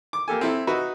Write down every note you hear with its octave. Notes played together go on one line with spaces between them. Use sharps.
D6
A#3 G4 A4 G#5
C4 E4 A4
D#4 F#4 B4 E5